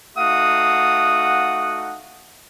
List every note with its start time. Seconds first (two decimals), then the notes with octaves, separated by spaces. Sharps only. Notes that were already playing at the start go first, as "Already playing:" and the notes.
0.17 A3 D#4 F#4 F5 F#5 D#6